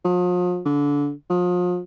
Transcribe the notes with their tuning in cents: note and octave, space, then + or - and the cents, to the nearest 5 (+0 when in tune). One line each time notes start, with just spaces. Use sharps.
F3 +40
D3 -25
F3 +35